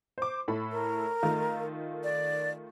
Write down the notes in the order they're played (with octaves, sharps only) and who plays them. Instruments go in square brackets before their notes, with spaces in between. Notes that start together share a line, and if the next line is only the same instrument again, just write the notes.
[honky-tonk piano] C5 D6
A2 A4 B5
[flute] A#4
[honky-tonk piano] D#3 A3 F4
[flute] D5